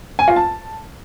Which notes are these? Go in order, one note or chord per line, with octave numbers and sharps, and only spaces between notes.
G#5
F4
A5